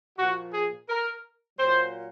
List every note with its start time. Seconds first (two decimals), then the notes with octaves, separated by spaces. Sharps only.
0.19 A#2 F3 F#4
0.53 G#4
0.89 A#4
1.59 A#2 F#3 C5